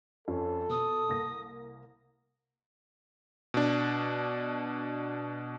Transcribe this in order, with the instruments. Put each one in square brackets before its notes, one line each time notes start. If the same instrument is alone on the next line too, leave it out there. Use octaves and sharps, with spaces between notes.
[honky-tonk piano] F2 F3 C#4 [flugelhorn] A4
[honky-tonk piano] B2 [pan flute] D#6
[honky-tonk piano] C2 A#3 A#6
[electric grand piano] B2 D4